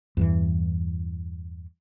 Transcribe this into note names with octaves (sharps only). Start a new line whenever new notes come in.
E2 G2 E3